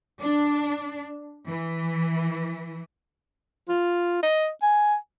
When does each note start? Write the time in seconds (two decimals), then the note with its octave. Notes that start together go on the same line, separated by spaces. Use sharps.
0.21 D4
1.47 E3
3.69 F4
4.23 D#5
4.62 G#5